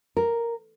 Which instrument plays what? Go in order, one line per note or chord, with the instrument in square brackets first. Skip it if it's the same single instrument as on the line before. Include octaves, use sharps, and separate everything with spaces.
[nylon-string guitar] A#4